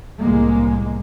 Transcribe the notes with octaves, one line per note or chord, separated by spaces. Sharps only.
C2 A2 G#3 A#3